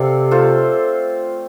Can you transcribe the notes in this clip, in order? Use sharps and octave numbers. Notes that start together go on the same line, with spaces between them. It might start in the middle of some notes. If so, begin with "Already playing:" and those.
Already playing: C3 C4 A4 D5 F5
A3 F4 A4 C5